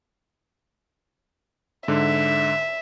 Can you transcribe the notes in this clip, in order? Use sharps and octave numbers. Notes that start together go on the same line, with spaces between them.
G#2 D3 E5